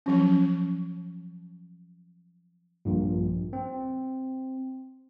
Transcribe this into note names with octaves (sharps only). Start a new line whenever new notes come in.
F3 F#3 C#4
A#1 G2 A#2
C4